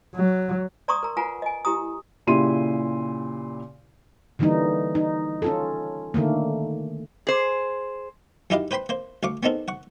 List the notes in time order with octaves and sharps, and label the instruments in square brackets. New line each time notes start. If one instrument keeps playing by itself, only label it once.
[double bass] F#3
[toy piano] D5 A#5 C6 C#6 D#6
A#4 A#5
F4 B4 F#5 G#5 A#5
D#5 G#5
E4 G4 A#5 D#6
[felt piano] A#2 C#3 E4 G4 C6 D#7
[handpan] D3 E3 G3 A#3 D#4
D#4
C#4 F4 A4
D3 D#3 A3 A#3
[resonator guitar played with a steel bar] G#4 C5
[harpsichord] F#2 D#4 E4 G4 D#5 F5
B4 C5 G5 B5 C6
A#3 C5
D2 F5 C#6 D6
B3 C4 D#4 A4 A#4
F#5 C#6